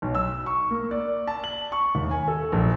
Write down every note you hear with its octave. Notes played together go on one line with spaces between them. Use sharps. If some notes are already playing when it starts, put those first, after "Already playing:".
B1
E6
C#6
A#3
D5
A5
F#7
C#6
D#2
G#5
A4
A#1